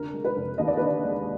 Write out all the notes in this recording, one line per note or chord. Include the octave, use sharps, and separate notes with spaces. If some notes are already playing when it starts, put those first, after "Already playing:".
Already playing: F1 D3 A#4
G#3
B4
F1
D#2 D#5
D5
D3 B4
D5
G#3